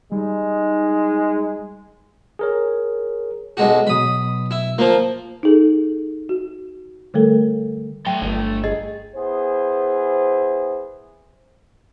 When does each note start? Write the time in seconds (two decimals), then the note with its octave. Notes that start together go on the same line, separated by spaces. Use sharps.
0.12 G3 G#3 D#4
2.39 G#4 A#4 C#5
3.57 B1 G#3 F#4
3.87 B2 F#3 G#3 B5 D#6
4.51 E4
4.78 F3 A#3 F4
5.43 D#4 G#4 A4
6.29 F#4
7.14 D3 G3 A3 A4 A#4
8.06 F#3 A3 G5 C6
8.22 G1 G#5
8.64 G#4 D#5
9.16 B3 E4 G#4 C5